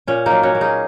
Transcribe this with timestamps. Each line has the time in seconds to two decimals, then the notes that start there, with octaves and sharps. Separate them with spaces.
0.07 A#2 C#4
0.26 A#3 D#4
0.32 F#3
0.43 C#4 F#4
0.55 A#3
0.61 D#4 G#4